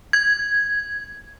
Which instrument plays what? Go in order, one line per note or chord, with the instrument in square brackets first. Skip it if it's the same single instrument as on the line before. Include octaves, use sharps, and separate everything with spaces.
[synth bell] G#6